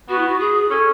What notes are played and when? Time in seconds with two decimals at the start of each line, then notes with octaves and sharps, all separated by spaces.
0.09 B3 F#4
0.18 E4
0.28 F#4
0.40 G#4
0.70 C#4 A4